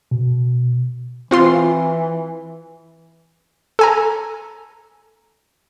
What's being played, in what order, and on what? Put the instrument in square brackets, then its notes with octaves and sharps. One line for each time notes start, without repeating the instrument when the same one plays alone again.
[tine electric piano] B2
[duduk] E3 [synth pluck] C4 F4 C6
[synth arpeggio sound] A4 G#5 A#5